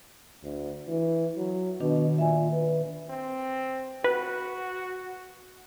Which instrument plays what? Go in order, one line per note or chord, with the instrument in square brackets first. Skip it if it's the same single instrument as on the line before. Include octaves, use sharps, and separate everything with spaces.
[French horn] D2
E3
F#3
[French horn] B2 [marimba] D#3 D4
[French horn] A#2 [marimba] E5 G#5
[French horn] B4
[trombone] C4
[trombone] F#4 [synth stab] B4